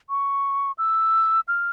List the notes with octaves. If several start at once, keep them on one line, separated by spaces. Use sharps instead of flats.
C#6
E6
F6